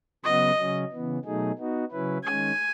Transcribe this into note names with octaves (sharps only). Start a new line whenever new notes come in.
C#3 F#3 B3 F#4 D#5
C#3 F#3 C#4
C#3 E3 B3
B2 F#3 A3 D#4 G#4
B3 D#4 F#4
C#3 F#3 C#4 E4 B4
D#3 G#3 C#4 G#5